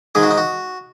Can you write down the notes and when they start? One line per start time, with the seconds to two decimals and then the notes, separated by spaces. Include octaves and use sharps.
0.15 G#2 D#3 G#3 G#4
0.23 F#4
0.31 D#4
0.38 F#4